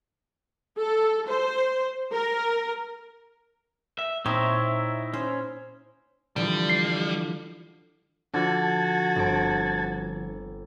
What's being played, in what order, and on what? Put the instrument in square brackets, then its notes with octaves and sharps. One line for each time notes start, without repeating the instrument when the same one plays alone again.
[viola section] A4
C5
A#4
[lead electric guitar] E5
[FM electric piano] A#2 [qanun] C4 [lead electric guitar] D#4 E4 [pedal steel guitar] C#5 E5
[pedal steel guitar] C#4 [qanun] C5
[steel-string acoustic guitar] D3 E3 F3 [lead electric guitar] G3
[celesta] C7
[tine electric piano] D3 F3 [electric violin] F#4 [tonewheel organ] A5 G#6 A6
[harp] G1 C4 D7